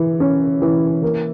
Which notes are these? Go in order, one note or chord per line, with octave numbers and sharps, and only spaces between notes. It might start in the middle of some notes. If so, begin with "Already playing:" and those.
Already playing: E3
C#4
E3
A#3